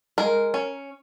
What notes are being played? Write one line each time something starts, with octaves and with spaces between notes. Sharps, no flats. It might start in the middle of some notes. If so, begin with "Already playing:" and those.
G#3 A#4
C#4